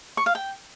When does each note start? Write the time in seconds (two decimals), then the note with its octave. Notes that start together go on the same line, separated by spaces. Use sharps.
0.17 C#6
0.26 F5
0.35 G5